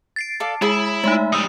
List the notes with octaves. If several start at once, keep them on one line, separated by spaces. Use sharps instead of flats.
A6 C7 D7
A4 D5 F5
G#3 E4 G#4
G#3 A3 D#4 E5
G3 D#4 D#6 E6